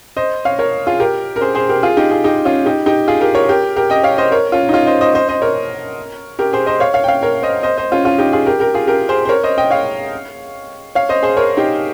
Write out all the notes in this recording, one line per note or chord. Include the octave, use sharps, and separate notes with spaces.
C5 D#5
C#5 F5
A#4 C#5
F4 G#4
G4 A#4
A#4
G#4 C5
G#4 C5
G4 A#4
F4 G#4
D#4 G4
F4 G#4
D#4 G4
C#4 F4
D#4 G4
D#4 G4
F4 G#4
G4 A#4
A#4 C#5
G4 A#4
G4 A#4
D#5 G5
C#5 F5
C5 D#5
A#4 C#5
C#4 F4
D#4
C#4 F4
C5 D#5
C5 D#5
C5 D#5
C5 D#5
A#4 C#5
G4 A#4
G#4 C5
C5 D#5
C#5 F5
C#5 F5
G5
C#5 F5
A#4 C#5
C5 D#5
C5 D#5
C5 D#5
C#4 F4
C#4 F4
D#4 G4
F4 G#4
G4 A#4
G4 A#4
F4 G#4
G4 A#4
G#4 C5
C5
A#4 C#5
C5 D#5
D#5 G5
C#5 F5
C#5 F5
C5 D#5
G#4 C5
A#4 C#5
D#4 G4